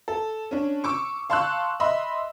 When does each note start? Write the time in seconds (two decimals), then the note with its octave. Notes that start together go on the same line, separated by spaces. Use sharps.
0.08 A4
0.51 C#4 D4
0.84 C#6 D6 E6
1.30 F5 A5 C6 C#6 E6 F#6
1.80 D#5 E5 B5 C6 E6